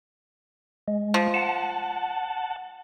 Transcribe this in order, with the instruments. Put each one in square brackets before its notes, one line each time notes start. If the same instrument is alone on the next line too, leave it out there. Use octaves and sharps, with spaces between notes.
[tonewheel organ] G#3
[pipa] F3
[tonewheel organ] F#5 A5